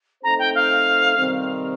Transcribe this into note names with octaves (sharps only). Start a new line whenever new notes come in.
A3 C4 D#4 A4 C5 A#5
G5
F5
C3 D#3 G3 C4